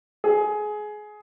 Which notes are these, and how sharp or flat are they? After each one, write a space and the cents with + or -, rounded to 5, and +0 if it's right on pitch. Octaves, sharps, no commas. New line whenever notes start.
G#4 +20